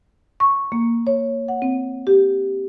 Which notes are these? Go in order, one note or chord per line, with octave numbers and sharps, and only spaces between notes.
C#6
A#3
C#5
F#5
C4
G4